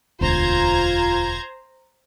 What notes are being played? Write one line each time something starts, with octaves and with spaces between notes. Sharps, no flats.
E1 D2 F4 C5 A#5 G#6